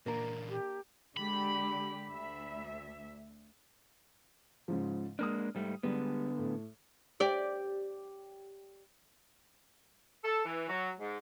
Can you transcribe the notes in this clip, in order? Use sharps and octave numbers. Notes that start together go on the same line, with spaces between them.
A#2 E3 A#3 D4 A#4
G4
D3 G#3 G4 B5
D2 E5
G#2 C#3 F3
G#3 A#3 D4 D#6 F6
G#2 G3 A3
D3 G3 G#3 B3 D4
A2
G4 D5
A4
E3
F#3
G#2